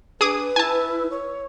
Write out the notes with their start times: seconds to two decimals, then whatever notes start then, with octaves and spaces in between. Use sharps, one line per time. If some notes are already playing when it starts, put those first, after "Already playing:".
0.21 D4 G#4 B4 D6 D#6
0.56 E4 G#5 A5
1.10 C#5